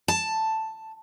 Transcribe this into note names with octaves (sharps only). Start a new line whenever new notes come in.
A5